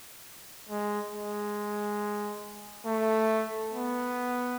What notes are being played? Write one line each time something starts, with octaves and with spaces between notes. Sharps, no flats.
G#3
G#3
A3
B3